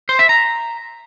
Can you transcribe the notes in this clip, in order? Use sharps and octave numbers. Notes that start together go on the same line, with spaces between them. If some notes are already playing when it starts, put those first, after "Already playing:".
C5
E5
A#5